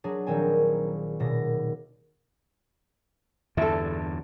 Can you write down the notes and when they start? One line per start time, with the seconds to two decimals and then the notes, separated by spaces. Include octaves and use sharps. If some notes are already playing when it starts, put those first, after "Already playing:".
0.04 F#3 D4 G#4
0.27 A#1 D#3 C4 G#5
1.20 D#1 B2 A#6
3.57 E2 G2 D3 E4 A4